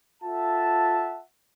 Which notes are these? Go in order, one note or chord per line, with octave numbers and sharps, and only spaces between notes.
F4 A4 E5 F#5 A5